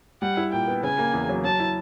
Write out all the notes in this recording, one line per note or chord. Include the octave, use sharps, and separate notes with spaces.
G3 F#5
E4
A#2 G5
B3
C#3 G#5
A#3
E2
F#3
F#3 A5
E4